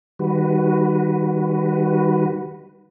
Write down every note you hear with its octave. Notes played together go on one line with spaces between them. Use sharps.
D#3 G3 F#4 B4